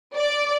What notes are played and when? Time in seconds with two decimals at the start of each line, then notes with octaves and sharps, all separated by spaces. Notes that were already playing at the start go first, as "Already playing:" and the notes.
0.16 D5